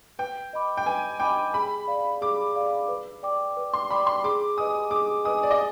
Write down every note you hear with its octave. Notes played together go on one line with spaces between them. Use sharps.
B4 G5
D#5 B5 D6
G5
B4 G#5
D#5 G5 B5 D6
G#4 B5
D5 F5
G#4 D6
D5 F5
B4
D5 G5 D6
B4
C6
D5 G5 B5 D6
C6
G#4 D6
B4 D#5 G#5 D#6
G#4 D6
B4 D#5 G#5 D#6
D5
D#5